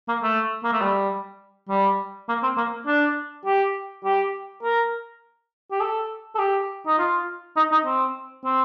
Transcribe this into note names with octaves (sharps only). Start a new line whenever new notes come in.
A#3
A3
A#3
A3
G3
G3
A#3
C4
A#3
D4
G4
G4
A#4
G4
A4
A4
G4
D#4
F4
D#4
D#4
C4
C4